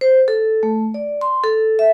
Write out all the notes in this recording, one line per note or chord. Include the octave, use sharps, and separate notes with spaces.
C5
A4
A3
D5
C6
A4
E5